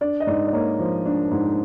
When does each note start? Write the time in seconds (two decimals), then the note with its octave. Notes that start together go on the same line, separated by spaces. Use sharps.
0.01 D4 D5
0.20 D#5
0.27 G#2 D5
0.47 D5
0.53 A#3 C#5
0.79 F3
1.06 D4
1.31 G#2